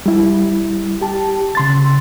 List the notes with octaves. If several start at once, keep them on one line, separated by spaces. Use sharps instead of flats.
G3 E4
G4 A5
C#3 C6 A6